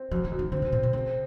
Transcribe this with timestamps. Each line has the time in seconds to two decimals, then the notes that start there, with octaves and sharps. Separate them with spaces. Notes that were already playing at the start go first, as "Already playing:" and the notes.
Already playing: C4
0.11 F#2 F3
0.25 E3
0.32 F#2
0.39 D#3
0.52 D3 C4
0.62 C3
0.72 A#2 C4
0.83 B2
0.93 C#3 C4